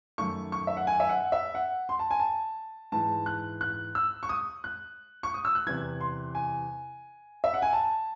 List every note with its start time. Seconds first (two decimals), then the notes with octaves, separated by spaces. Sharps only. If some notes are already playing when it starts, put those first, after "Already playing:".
0.18 F#2 D#3 A3 C#6
0.52 C#6
0.67 E5
0.77 F#5
0.87 G#5
1.00 E5
1.09 F#5
1.32 E5
1.55 F#5
1.89 C6
1.99 A5
2.11 G#5
2.20 A5
2.92 G#2 E3 G#3 A5
3.26 F#6
3.61 F#6
3.95 E6
4.23 C#6
4.29 D#6
4.64 F#6
5.23 C#6
5.34 D#6
5.45 E6
5.55 F#6
5.67 E2 C3 E3 G#6
6.01 C6
6.35 G#5
7.44 E5
7.54 F#5
7.62 G#5
7.73 A5